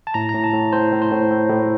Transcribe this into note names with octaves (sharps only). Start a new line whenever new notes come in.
A5
A2 A#5
A2 A#5
A5
A2
A2 C5
A2
C5
A2
A2
A2